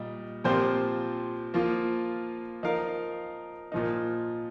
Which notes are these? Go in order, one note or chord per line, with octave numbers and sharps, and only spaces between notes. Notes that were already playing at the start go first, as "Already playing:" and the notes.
Already playing: A#2 G3 D#4
A#2 F3 C4 G4 C5
F3 A#3 F4
F3 D#4 A#4 F5
A#2 F3 D#4